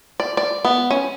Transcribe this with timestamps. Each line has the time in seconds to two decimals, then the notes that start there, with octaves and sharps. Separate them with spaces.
0.20 D5
0.37 D5
0.65 B3
0.91 C#4